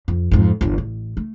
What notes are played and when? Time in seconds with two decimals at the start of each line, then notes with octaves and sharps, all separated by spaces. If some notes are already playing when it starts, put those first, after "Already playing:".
0.08 F2
0.31 F2 G#2
0.61 G1 E2
0.78 A1
1.17 A3